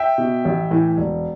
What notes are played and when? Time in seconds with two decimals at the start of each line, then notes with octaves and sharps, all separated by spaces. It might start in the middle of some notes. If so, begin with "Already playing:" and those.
Already playing: E5 G5
0.18 B2
0.45 A1
0.71 A2 E3
0.97 E1